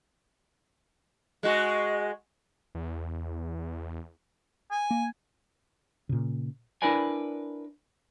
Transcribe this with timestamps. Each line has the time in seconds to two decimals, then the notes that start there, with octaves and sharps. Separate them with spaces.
1.43 G#3 F#4 D#5
2.75 E2
4.71 G#5
4.91 A#3
6.09 A#2 C#3
6.82 D4 E4 A#4 B4 D5 G#5